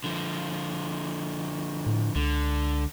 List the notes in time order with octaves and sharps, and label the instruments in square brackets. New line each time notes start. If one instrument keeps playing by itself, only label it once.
[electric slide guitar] D3 F3
[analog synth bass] A2
[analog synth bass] C#2 [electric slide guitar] D3